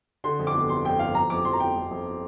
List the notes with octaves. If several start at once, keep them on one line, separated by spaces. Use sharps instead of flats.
D3 C6
F2
D6
G1
F2 C6
F2 G5
G1 F5
F3 A#5
F2 D6
F3 C6
A#5
F2 G5
F2
F2